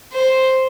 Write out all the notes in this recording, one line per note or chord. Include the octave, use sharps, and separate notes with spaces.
C5